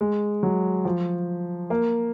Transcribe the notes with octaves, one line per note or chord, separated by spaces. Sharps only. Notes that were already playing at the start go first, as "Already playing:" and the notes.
G#3
F#3
F3
A#3